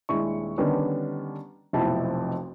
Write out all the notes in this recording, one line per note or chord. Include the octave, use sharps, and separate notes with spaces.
D#1 G#3 D4 E4 C#6
D3 D#3 G3 B3 C#4 D4
F1 B1 F2 C4 E4 A5